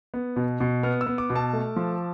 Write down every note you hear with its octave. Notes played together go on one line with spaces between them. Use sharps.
B3
B2
B2
B3 F6
E6
B3
D6
B2
A5
A3
F3